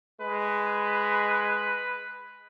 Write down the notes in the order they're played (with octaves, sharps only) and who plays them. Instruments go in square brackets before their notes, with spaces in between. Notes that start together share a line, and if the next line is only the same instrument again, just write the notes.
[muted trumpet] G#3 [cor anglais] B4